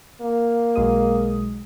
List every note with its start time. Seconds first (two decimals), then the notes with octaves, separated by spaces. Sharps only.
0.21 A#3
0.76 B1 G#3 D#6